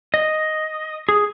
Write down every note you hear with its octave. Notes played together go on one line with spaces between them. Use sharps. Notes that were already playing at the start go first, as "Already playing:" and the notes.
D#5
G#4